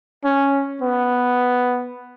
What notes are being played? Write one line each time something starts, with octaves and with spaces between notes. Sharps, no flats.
C#4
B3